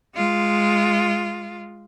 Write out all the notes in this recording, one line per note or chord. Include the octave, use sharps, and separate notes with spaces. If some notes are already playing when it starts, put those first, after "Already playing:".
G#3 F4